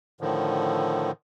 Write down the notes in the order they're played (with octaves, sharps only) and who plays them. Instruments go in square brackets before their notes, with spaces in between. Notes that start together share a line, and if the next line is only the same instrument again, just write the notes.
[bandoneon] A2 D3 D#3 F3